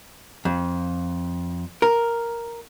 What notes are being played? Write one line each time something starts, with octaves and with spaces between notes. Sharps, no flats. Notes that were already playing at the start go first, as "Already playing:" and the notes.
F2
A#4